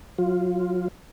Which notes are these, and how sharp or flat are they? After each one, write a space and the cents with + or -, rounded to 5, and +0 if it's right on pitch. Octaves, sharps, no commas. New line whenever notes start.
F#3 -30 F4 +0